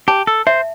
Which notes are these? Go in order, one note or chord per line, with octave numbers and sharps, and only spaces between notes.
G4 A5
A4
C5 E5